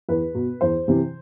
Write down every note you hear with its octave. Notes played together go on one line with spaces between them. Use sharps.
E2 B4
B2
E2 C5
C3 E3